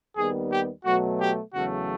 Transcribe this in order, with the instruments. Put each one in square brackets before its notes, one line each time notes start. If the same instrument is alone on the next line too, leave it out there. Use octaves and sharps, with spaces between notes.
[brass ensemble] D#2 D#3 G3 B3 G#4
G4
B2 F#3 A3 F#4
G4
E2 C#3 F#3 A3 F#4